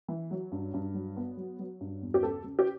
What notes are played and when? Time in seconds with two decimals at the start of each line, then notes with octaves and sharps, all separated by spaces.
0.08 E3
0.31 F#3
0.52 G2
0.74 G2
0.94 F#3
1.17 B3
1.37 F#3
1.59 F#3
1.81 G2
2.02 E2
2.14 G4
2.23 C#3 A4
2.44 C#3
2.59 G4